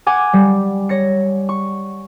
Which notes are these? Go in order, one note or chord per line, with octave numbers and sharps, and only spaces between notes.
F#5 G#5 D6
G3
C#5 A#6 C#7
C#6